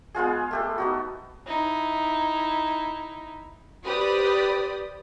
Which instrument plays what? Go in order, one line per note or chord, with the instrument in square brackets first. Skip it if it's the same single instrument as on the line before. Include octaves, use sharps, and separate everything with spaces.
[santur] G#3 B3 F4 G#4
A3 G4 A4
B3 D#4 F#4
[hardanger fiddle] D#4 E4
[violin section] G4 B4 C5 D5 D#6